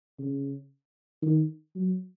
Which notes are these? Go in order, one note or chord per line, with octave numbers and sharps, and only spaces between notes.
C#3
D#3
F#3